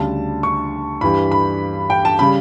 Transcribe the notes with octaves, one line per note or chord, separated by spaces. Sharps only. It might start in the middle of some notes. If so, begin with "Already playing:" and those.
Already playing: D2 C#3 G3 A5
C#6
G2 E3 G3 B5
B5
G5
A5
C#3 G3 B5